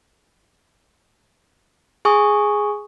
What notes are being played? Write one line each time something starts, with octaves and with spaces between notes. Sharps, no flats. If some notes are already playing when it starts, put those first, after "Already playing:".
G#4 G#5 C#6 D#6